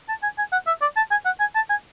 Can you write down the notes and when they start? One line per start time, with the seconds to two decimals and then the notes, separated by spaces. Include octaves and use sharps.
0.09 A5
0.23 G#5
0.38 G#5
0.52 F#5
0.67 E5
0.81 D5
0.97 A5
1.11 G#5
1.25 F#5
1.40 G#5
1.55 A5
1.70 G#5